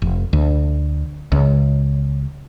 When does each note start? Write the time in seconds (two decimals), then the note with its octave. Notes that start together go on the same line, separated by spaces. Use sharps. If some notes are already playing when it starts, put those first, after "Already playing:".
0.02 F1
0.33 D2
1.32 C#2